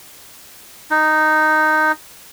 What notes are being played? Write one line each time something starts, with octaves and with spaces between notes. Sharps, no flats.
D#4